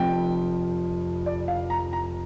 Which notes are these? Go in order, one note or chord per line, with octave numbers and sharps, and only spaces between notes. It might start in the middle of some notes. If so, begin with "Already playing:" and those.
Already playing: F1 F2 F3 G5
D5
F5
A#5
A#5